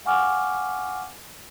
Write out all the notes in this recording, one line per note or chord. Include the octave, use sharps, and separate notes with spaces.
F5 F#5 G#5 C#6 D6 F6